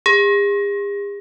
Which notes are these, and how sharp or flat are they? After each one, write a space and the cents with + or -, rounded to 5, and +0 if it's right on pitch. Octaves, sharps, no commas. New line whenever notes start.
G#4 -45